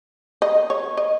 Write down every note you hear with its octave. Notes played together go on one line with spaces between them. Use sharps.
D#5
C#5
D#5